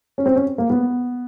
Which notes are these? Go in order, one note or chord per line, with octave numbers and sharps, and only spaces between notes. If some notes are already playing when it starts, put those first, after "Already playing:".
C#4
C4
C#4
A#3
B3